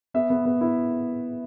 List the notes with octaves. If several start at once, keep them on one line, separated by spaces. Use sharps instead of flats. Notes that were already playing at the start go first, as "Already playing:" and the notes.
B3 E5
B3
B3
E4